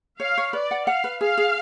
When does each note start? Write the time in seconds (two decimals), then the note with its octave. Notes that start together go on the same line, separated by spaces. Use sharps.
0.20 C#5 F5
0.38 C#5
0.53 B4 D5
0.71 F#5
0.87 F5 F#5
1.04 B4
1.21 G#4 F5
1.38 G#4